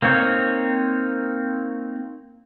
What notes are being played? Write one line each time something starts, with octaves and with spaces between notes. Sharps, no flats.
A#3 C4 D#4 C#5